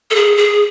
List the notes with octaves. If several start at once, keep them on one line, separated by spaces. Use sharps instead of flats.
A4
G#4
G#4